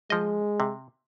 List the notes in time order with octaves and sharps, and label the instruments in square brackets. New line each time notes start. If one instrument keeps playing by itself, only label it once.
[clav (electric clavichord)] F3 D#5 [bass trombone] G#3
[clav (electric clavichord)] C3